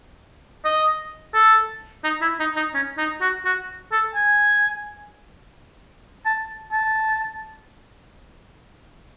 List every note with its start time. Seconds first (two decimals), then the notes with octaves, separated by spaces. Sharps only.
0.65 D#5
1.34 A4
2.04 D#4
2.21 E4
2.40 D#4
2.56 D#4
2.74 C#4
2.98 D#4
3.21 F#4
3.45 F#4
3.92 A4
4.15 G#5
6.26 A5
6.72 A5